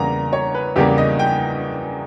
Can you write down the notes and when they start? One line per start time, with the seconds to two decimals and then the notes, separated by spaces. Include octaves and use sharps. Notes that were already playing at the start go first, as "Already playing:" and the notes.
Already playing: E2 C#3 G3 A#3 A#5
0.33 C#5
0.55 B4
0.76 E2 C#3 G3 A#3 G4
0.98 D#5
1.19 G5